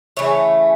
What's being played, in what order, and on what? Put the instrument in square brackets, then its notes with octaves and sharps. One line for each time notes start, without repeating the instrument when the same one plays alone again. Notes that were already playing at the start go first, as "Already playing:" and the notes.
[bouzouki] C#3 E3 A3 C#5